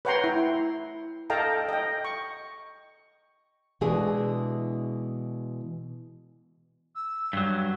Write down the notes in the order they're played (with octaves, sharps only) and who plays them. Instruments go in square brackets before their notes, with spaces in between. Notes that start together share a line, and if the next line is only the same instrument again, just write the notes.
[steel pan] B4 C#5 F#5 G5 A#5 C6
E4
A4 D#5 F5 G5 A5 A#5
D#5 G5
C#6
[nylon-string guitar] B2 E3 G#3 D4 E4 G#4
[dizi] E6
[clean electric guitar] G2 F#3